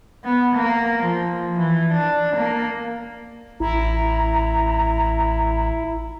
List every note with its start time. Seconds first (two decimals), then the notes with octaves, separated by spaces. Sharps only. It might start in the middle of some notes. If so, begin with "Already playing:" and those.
0.24 B3
0.55 A#3
1.04 F3
1.57 E3
1.93 D4
2.36 A#3
3.60 A1 E4 A#5